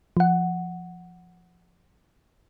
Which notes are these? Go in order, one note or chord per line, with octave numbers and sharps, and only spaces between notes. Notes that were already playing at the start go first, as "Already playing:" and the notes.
F3 F#5